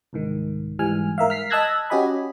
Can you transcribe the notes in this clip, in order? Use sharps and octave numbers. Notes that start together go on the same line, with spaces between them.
C2 G#2 D#3
G#2 E3 G3 G#5 F6
G#2 A#4 E5 F5
F6 B6 C7
D#5 A5 E6 F#6 G#6 A#6
C#4 F#4 G4 D#5 G#5 B5